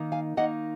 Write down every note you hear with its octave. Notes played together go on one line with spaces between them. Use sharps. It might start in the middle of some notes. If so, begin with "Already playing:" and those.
Already playing: D#3 A#3 D#4
F5 G#5
D#3 A#3 D#4 D#5 F#5